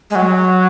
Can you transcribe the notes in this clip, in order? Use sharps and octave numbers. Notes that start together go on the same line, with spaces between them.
G#3
F#3